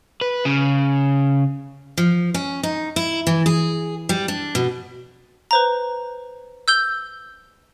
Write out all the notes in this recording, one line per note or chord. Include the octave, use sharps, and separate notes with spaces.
B4
C#3
F3
C#4
D#4
E4
E3
G#4
G3
D4
B2
B4 C5 A#5
E6 G6 G7